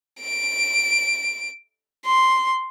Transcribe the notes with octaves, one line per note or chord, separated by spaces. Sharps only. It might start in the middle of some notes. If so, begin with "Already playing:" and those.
D7
C6